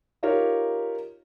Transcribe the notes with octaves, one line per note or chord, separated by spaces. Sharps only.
D#4 F4 G4 A#4 C#5